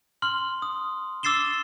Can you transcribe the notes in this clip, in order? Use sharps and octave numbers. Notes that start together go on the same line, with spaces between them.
C6 F6 F#7
D#6
D6 E6 A6 C7 E7 G7